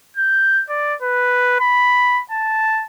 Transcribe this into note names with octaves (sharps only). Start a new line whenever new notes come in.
G6
D5
B4
B5
A5